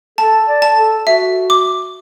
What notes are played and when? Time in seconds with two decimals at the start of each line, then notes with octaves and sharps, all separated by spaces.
0.18 A4 A5
0.47 D5
0.62 A5
0.76 A4
1.07 F#4 E5
1.50 D6